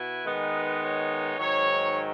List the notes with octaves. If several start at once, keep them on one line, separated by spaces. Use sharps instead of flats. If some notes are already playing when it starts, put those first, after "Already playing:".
Already playing: B2 E4 B4
D#3 G#3 B3 D#4
C#5
G#2 D#3 F#3 C#5